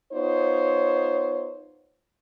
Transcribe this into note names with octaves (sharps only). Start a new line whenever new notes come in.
B3 D#4 F4 C5 C#5